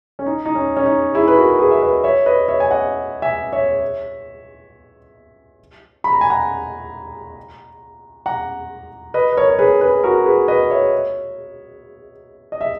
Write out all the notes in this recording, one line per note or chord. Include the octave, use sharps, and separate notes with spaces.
C#4
D#4
D#4
C#4
C#4
D#4
E4 G#4
B4
F#4 A#4
G#4 B4
E5
B4 D#5
C#5 E5
B4 D#5
C#5 E5
G#5
D#5 F#5
E5 G#5
C#5 E5
B5
A#5
G#5
F#5 A#5
F#5 A#5
B4 D#5
B4
A#4 C#5
C#5
G#4 B4
G#4 B4
F#4 A#4
G#4 B4
B4 D#5
C#5 E5
D#5
E5